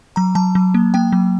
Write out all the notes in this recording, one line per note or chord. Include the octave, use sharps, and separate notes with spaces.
F#3 A#5
F#3 A5
F#3
A#3
A#3 G5
F#3